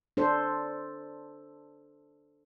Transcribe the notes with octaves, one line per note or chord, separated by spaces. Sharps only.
D4 A4 C5